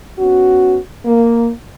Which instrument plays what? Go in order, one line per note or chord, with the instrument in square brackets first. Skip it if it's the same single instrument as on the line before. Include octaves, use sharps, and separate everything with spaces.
[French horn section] B3 C#4 F#4
A#3